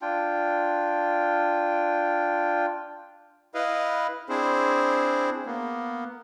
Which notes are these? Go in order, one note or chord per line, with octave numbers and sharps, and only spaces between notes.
D4 F4 G5
E4 B4 D#5 F5
C4 D4 E4 G#4 C5
A#3 B3